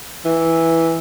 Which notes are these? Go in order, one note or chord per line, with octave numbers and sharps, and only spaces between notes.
E3